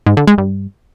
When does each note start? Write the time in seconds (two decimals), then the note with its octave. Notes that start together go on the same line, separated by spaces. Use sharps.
0.06 G#2
0.17 D3
0.27 G#3
0.38 G2